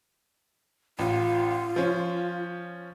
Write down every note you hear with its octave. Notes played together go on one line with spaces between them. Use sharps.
A1 F4
F3 C#4